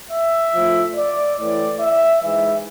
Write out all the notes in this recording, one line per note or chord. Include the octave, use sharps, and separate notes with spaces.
E5
A2 F3
D5
A2 E3 D5
E5
G#2 E3 E5